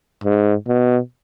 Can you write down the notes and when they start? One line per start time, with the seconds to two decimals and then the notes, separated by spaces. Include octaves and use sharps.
0.24 G#2
0.67 B2